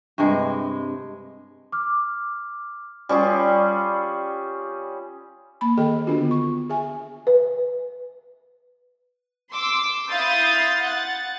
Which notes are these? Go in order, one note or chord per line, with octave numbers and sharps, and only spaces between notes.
G2 C3 G#3
D6 F6
G3 C#4 F4 G#4
A#3 B5
D#3 G#4 A4 D#5 G5
D3 B3 D4 F4 F#4
C#6
G#4 E5 G#5
B4
C6 D6 E6
E4 F5 C6 D#6 G6 A6
F#5 A6